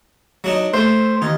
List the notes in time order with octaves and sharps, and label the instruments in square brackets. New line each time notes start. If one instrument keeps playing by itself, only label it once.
[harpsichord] F#3 D4 D#4
[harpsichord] A3 [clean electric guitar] C5
[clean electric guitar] D#2 [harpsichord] D#4